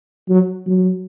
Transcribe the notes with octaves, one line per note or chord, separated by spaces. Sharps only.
F#3
F#3